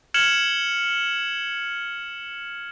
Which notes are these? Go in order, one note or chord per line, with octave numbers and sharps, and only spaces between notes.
F6 G#6 C#7 E7 F#7